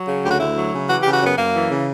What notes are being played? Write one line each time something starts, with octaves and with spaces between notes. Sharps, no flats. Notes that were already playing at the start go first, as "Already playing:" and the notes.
Already playing: F#3
C#3
D2 G4
F#4
D2 E4
F#3
C#3
E3 F#4
G4
C#3
F#4
F#2 B3
F#2 A#3
E3
C#3